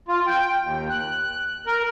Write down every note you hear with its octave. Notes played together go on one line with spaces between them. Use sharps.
F4
G5
D#2
F#6
A#4